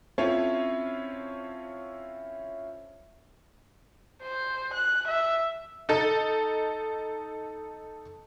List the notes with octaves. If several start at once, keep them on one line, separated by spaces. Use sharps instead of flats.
C4 C#4 E4 F4 A4 C#5
C5
F#6
E5
D#4 A4